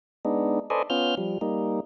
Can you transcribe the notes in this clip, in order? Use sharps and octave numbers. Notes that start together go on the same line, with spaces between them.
G#3 B3 D4 D#4
A4 B4 C5 D5 D#5 G#5
B3 C#4 F4 F6 G6
F3 G3
G3 A#3 D#4